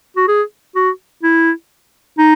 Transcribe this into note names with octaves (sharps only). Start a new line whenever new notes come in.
F#4
G#4
F#4
E4
D#4